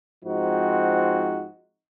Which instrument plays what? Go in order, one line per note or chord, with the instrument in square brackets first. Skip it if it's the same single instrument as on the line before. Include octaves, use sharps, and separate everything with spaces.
[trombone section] G#2 F3 C4 D#4 F#4